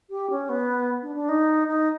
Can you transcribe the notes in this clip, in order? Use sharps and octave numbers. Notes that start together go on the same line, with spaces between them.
G4
C#4
B3
D4
D4
D#4
D#4